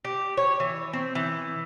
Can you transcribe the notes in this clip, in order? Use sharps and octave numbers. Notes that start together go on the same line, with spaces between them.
G4
C#5
E3
C4
E3